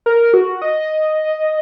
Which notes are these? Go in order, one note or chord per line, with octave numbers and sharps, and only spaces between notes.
A#4
F#4
D#5